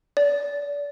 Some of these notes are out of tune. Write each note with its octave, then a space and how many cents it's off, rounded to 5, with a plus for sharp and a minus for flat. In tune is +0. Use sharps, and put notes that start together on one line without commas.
D5 -30